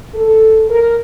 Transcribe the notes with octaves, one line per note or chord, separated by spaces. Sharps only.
A4
A#4